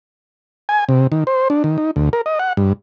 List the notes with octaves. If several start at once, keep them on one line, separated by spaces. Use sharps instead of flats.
G#5
C3
D#3
C5
D4
D#3
D#4
D2
A#4
D#5
F#5
G2